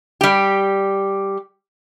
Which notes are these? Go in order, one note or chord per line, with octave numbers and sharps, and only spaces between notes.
G3 G4